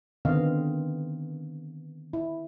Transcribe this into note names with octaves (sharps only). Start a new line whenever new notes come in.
D3 D#3 B3 C4 D#5 F5
E4